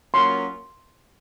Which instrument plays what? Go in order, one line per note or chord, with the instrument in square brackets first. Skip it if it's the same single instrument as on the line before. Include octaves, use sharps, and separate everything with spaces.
[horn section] F#3 A#3 C#4 F4 [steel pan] C6